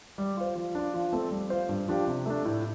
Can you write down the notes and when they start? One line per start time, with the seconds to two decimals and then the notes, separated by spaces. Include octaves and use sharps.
0.18 G3
0.37 F4 C5
0.55 F3
0.75 D4 F4
0.94 F3
1.13 A3 C4 A4
1.31 G3
1.50 F4 C5
1.69 G2
1.88 F3 D4 G4
2.07 C3
2.26 A3 D4
2.45 A2